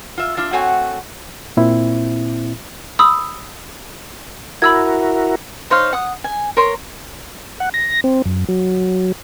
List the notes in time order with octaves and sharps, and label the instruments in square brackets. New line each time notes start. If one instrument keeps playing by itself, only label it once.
[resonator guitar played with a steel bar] F4 E5
D4 F4 E5
A3 C4 F#4 C#5 F#5 G#5
[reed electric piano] A#2 C4 E4
[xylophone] B5 D#6 E6
[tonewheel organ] E4 F#4 A#4 [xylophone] B5 E6 G#6
[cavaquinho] D#4 C5 C#5 F5
F#5 D#6
G#5
A#4 C#5 C6
[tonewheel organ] F#5
A#6
C4
F#2
F#3